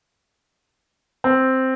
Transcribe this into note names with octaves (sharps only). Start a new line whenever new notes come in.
C4